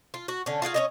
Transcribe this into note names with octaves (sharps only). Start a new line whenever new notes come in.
F4
F#4
D3 C#4
F4 F#4 G#4 F5
C#4 C#5 D#5